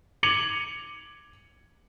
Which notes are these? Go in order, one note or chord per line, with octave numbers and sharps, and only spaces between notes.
D6 G#6 C#7 D#7 F7 F#7